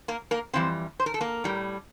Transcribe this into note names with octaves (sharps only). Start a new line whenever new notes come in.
A#3 A#4
A#3 A#4
F2 E3 G3 C4 C5
C5
A#4
A4
A#3 A#4
A2 G3